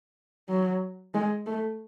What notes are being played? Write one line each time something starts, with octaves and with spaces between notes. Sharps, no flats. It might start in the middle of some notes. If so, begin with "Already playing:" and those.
F#3
G#3
A3